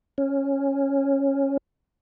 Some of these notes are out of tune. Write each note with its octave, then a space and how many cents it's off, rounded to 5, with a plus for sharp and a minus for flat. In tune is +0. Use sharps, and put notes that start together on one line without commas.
C#4 -10